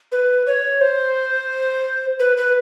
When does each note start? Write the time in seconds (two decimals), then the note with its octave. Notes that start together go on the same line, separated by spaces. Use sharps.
0.12 B4
0.47 C#5
0.81 C5
2.19 B4
2.37 B4